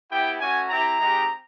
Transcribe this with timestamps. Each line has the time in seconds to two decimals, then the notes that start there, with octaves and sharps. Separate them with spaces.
0.10 B3 E4 G4 G5
0.40 A3 C#4 F#4 G#5
0.69 C4 E4 G4 A#5
0.98 G#3 C4 D#4 G4